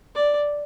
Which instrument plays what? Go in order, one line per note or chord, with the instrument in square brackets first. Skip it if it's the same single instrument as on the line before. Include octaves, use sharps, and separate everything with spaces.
[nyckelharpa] D5